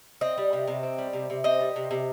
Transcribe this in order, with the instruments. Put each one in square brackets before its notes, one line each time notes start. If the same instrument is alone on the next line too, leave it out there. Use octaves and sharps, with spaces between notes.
[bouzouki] C4 D#5
G3
C3
C3
C4
G3
C3
C3
C4 D#5
G3
C3
C3